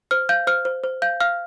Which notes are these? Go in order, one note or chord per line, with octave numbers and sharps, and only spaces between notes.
C5 F6
F5 G6
C5 F6
C5
C5
F5 G6
F5 F6